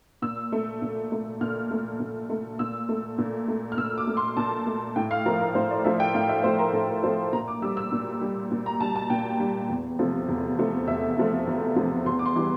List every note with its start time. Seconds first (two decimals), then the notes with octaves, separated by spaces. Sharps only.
0.22 A#2 E6
0.52 A3
0.82 A#2
1.12 A3
1.41 A#2 F6
1.71 A3
2.00 A#2
2.29 A3
2.59 A#2 E6
2.89 A3
3.18 A#2
3.48 A3
3.72 F6
3.78 A#2 E6
3.98 D6
4.07 A3
4.17 C6
4.37 A#2 A5
4.66 A3
4.96 A2 G5
5.11 F5
5.26 F3 A3 A#4
5.40 A#4
5.55 A2 C5
5.71 D5
5.85 F3 A3 E5
6.00 G5
6.14 A2 F5
6.29 E5
6.44 F3 A3 C5
6.59 A#4
6.73 A2 A4
6.88 A#4
7.03 F3 C5
7.07 A3
7.33 A#2 A#5
7.48 D6
7.62 G3 E6
7.77 E6
7.92 A#2
8.21 G3
8.51 A#2
8.66 A#5
8.80 G3 A5
8.96 A5
9.10 A#2 G5
9.40 G3
9.69 E2
9.99 C3 F3 A3
10.29 E2
10.58 C3 F3 A3
10.88 E2 E5
11.17 C3 F3 A3
11.47 E2
11.76 C3 F3 A3
12.06 E2 C6
12.19 D6
12.26 C6
12.36 E3 G3